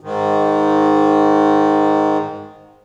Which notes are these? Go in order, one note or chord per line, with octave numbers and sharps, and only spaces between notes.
G#2 D#3